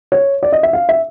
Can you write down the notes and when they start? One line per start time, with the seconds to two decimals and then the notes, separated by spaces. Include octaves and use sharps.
0.12 C#5
0.43 D5
0.52 D#5
0.63 E5
0.73 F5
0.89 E5